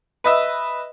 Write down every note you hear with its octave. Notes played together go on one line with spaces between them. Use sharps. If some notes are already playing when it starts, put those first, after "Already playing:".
B4 D#5 E5